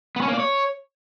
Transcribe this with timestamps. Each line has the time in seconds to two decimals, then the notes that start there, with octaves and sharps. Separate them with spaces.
0.16 B3
0.22 C#4
0.28 A#3
0.34 D5
0.40 C#5